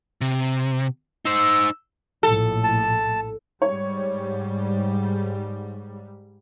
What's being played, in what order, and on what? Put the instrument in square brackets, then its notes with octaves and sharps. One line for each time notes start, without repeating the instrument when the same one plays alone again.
[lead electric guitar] C3
[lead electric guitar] D#4 C5 [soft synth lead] E6
[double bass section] A#1 A2 [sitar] A4
[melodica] A5
[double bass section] G#2 G3 [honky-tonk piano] C#5